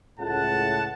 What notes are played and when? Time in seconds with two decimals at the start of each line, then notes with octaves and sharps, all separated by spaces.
0.19 C#2 A2 F#5 A5